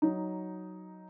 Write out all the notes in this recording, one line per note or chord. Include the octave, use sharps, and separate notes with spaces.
F#3 D#4